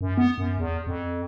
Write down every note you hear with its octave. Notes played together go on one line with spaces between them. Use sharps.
F#2
B3
F#2
E2
F2